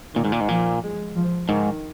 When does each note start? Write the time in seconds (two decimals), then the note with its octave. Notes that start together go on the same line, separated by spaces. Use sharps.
0.15 A#2 D#3
0.25 G#2
0.32 A#2
0.40 G#2
0.48 A#2 F3
0.82 G#3
1.15 F3
1.49 G#2 D#3